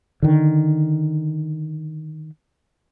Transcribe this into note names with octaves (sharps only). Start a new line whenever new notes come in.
D3 D#3